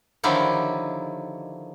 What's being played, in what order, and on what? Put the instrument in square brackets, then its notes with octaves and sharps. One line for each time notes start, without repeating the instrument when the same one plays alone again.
[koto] D3 D#3 F3 F#3 E4 G4